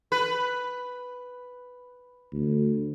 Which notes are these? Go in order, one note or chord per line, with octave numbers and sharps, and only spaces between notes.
B4
D2